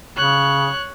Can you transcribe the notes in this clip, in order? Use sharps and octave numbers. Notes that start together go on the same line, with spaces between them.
C#3 C#5 F#6